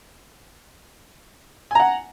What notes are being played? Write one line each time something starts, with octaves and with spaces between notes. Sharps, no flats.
F#5 G#5 A#5